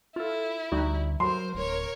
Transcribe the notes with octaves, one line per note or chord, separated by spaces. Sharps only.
E4 F4 A4
D2 G3 D#4 F#4
F#3 A#4 C5 C6
D1 A#4 C#5